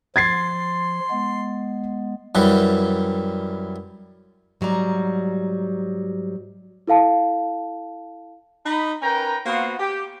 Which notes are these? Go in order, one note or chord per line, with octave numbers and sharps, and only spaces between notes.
F3 C6 G#6 A6 C7
G#3 B3
F#2 E3 G3
G#2 F#3 G3 A#5
E4 A4 F5 A5
D#4 B5
C#4 A#4 B4 G5 A#5
A#3 B3 F4 F#4 C5
G4